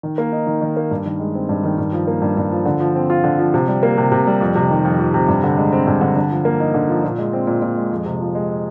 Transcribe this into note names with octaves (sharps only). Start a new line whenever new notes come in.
D#3
A#3
D#4
D#3
D#3
A#3
G2
D#3
G#3
C4
G2
D#3
G2
F3
A#3
G2
G2
F3
D3
F3
C4
F4
D3
F3
C3
G3
A#3
C3
C3
G3
F2
C3
D#3
F2
F2
C3
G2
D3
G#3
C4
G2
D3
D3
F3
A#3
D#4
D3
F3
A#2
G#3
C4
A#2
A#2
G#3
F2
C3
F3
G#3